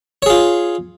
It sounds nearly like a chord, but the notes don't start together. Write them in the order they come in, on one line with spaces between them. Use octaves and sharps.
C#5 G#4 F4